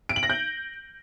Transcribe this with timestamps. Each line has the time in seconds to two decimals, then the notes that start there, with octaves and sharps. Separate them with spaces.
0.09 D7
0.16 F#7
0.23 A#6
0.30 G6